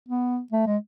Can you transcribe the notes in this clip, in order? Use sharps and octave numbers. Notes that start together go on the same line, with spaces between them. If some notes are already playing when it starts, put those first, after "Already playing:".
B3
A3
G#3